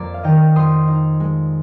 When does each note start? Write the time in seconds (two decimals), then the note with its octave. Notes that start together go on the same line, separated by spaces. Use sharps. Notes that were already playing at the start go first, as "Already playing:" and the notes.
Already playing: F2 A#3 D5 A#5
0.14 F5
0.23 D#3 D#5 G5
0.56 F2 C6 D#6
0.87 D#4
1.20 G#3